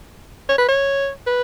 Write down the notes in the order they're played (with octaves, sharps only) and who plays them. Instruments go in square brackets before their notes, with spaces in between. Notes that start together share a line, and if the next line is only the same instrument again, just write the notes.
[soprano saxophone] C#5
B4
C#5
B4